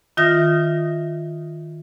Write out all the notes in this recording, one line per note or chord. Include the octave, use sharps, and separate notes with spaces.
D#3 F4 E5 D#6 F6 A#6